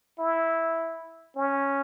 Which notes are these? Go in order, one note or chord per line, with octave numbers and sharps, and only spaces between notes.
E4
C#4